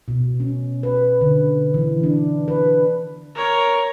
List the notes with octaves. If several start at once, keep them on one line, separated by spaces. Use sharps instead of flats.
B2
C#4
B4
D3
E3
D4
B4
A#4 C#5